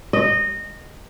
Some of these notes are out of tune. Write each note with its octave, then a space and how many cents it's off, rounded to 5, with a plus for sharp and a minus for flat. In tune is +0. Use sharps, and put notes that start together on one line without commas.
D#5 -20